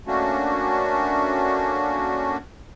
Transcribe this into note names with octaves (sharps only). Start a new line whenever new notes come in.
A3 A#3 C#4 D4 F#4